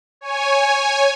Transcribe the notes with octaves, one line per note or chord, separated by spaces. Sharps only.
C#5 G#5